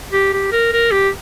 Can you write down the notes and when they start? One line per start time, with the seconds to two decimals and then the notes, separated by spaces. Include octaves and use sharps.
0.12 G4
0.33 G4
0.52 A#4
0.72 A#4
0.91 G4